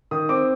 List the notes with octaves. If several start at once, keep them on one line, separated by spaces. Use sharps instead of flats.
D#3 D#6
C4 D6